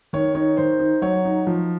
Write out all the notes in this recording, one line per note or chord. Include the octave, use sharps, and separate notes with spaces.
D#3 C#5
D#4 C#5
D#3 C5
D#4
F#3 C#5
D#4
F3